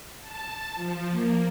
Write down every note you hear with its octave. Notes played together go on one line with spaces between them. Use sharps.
A5
F3
A#3